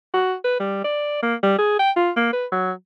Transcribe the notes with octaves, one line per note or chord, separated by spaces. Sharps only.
F#4
B4
G3
D5
A#3
G3
G#4
G5
F4
A#3
B4
F#3